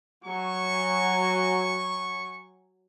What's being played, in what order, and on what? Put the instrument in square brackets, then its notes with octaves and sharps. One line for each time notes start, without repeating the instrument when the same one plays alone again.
[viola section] F#3 G#5 [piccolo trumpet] C#6